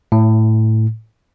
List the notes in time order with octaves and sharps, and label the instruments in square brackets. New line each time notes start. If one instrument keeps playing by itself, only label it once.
[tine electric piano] A2